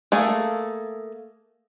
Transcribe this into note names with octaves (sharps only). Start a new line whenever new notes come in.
A3 A#3 G#4 A4